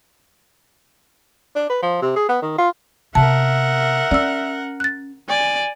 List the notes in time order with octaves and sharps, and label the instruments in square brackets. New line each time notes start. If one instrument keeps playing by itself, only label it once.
[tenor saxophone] D4
B4
F3
C3
G#4
B3
D#3
F4
[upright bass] C3 B3 [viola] A#4 F#5 [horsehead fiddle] E5 [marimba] A5
[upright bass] C#4 [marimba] D5 E6
[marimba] F#6 A6
[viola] D5 [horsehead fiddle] G#5